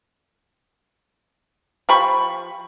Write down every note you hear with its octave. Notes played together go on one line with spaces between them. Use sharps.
F3 G4 B5 C#6